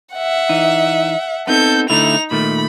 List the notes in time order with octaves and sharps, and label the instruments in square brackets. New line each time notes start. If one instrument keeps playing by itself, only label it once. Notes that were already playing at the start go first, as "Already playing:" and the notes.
[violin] E5 F#5
[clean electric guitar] E3 D#4
[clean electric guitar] B3 C4 D#4 [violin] A4 G6
[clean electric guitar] D3 A3 E4 [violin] D#4 F7
[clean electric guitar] A#2 D#3 A3 [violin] B5